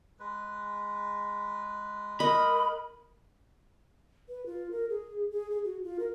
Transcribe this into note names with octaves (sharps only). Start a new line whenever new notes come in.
G#3 B4
A#4 D#5 B5
B4
F4
A#4
G#4
G#4
G#4
F#4
F4
A#4